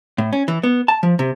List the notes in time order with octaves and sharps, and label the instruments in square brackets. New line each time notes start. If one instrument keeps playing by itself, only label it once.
[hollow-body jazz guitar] A2
C#4
E3
B3
A5
F3
C3